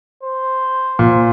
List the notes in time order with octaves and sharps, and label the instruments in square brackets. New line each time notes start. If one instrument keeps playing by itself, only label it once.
[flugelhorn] C5
[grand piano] A#2